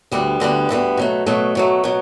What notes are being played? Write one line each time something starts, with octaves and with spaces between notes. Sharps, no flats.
D2 D3 G3 B3
D2 D3 G3 B3
D2 D3 G3 B3
B2 F#3 A3
B2 F#3 A3
B2 F#3 A3
B2 F#3